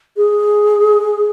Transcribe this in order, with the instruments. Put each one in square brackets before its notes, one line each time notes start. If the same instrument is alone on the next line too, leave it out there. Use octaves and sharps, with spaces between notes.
[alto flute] G#4